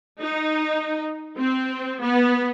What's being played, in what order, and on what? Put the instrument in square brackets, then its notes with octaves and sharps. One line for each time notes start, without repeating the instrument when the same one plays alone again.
[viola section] D#4
C4
B3